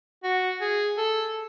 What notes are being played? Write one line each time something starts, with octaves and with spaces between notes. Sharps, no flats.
F#4
G#4
A4